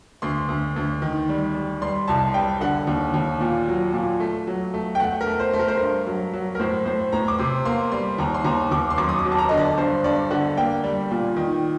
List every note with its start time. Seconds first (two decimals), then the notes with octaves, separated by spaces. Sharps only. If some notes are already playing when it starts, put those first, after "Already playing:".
0.22 D2 C6
0.49 D2
0.76 D2
1.02 D#3
1.29 G3
1.55 G3
1.82 G3 C6
2.08 C2 A5
2.34 G3 G5
2.61 D3 F#5
2.87 D#2
3.14 D#2
3.41 A#2
3.68 F#3
3.94 A#2
4.20 A3
4.47 F#3
4.74 A3
4.95 G5
5.00 A3 F#5
5.21 A#4
5.26 A3
5.40 C5
5.53 A3
5.59 A#4
5.68 C5
5.77 G2 A#4
6.07 F#3
6.33 F#3
6.55 A#4
6.60 A2 C5
6.86 A2 C5
7.12 A2 A#5
7.28 D6
7.39 C3 C6
7.65 A#3 C6
7.92 G3 C6
8.18 D#2 A#5
8.34 C6
8.45 D#2 A#5
8.71 D#2 D6
8.90 C6
8.98 F#2 D6
9.09 D#6
9.19 D6
9.25 F#3
9.32 A5
9.38 A#5
9.49 D3 D#5
9.57 D5
9.78 G2 C5
10.04 G2 D5
10.31 D3 F#5
10.57 A#3 G5
10.84 G3
11.11 A#2
11.36 D#3